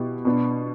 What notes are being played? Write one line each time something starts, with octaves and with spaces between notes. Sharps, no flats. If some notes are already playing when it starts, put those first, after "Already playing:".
Already playing: B2 B3 E4 G4
B2 B3 D4